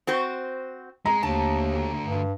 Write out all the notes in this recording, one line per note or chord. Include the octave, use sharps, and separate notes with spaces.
C4 F#4 C5
G#3 A#5
D#2 D3 A3 A5
G2